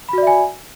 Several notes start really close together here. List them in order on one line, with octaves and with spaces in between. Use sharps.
B5 F#4 D5 E5 G#5